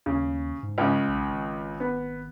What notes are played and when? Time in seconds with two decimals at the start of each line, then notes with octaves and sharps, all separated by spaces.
0.06 D#2 C#3
0.63 G#2
0.78 C#2 C#3
1.08 B1
1.27 G#1
1.80 B3